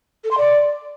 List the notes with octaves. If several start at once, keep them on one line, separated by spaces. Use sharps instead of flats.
A4
C6
D5